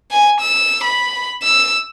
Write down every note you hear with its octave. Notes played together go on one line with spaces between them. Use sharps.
G#5
E6
B5
E6